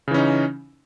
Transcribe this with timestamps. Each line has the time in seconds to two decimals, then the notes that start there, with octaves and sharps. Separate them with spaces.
0.08 C#3
0.11 E3
0.14 C#4
0.18 D#4